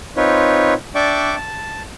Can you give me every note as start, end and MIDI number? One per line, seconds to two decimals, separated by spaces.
0.17 0.74 60
0.17 0.74 63
0.17 0.74 65
0.17 0.74 71
0.17 0.74 73
0.95 1.36 62
0.95 1.36 74
0.95 1.36 76
0.95 1.36 79
0.95 1.36 85
0.95 1.36 86
1.36 1.82 81